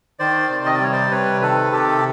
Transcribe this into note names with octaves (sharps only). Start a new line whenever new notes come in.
D#3 C5 D5
C3
D#5
D5
G3 C#5
C5 D5
C3 B4 C#5
D#3 A4 B4
C3 G4 A4